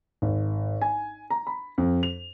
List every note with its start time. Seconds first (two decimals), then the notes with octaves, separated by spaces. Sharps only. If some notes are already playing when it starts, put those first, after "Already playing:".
0.22 G#1
0.81 G#5
1.30 A#5
1.47 B5
1.78 F2
2.03 F7